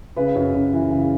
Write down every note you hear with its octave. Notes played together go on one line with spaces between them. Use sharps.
C#3 B4
F#2
F#2
E3
C#3